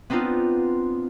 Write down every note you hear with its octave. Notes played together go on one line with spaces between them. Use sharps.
B3 C4 D4 D#4 F4